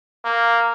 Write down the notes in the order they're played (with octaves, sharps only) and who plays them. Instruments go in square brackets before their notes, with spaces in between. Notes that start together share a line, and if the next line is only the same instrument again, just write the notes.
[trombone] A#3